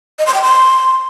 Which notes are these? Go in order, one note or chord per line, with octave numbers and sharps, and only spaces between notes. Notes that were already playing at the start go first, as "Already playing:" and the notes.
D#5
C6
G5
C6